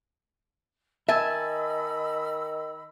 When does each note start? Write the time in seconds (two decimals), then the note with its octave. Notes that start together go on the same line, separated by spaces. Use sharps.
1.09 D#3 D#5 E5 G#5 A5 B5 E6